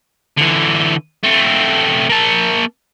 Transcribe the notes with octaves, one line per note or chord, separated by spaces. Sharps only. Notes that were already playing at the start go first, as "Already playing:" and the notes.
D3 E3
A3 C4
A#3 A5